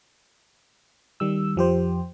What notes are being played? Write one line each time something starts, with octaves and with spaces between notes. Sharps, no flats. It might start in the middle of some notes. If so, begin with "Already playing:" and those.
D#3 G3 E6
F2 F3 G4 C5